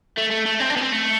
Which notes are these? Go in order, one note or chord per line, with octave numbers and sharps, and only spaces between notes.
A3
A3
A3
C4
D4
B3
C4
A3